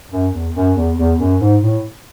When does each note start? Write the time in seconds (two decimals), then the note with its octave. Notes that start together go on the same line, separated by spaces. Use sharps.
0.11 F#2
0.33 E2
0.54 F#2
0.75 E2
0.97 E2
1.18 F#2
1.40 G#2
1.61 A2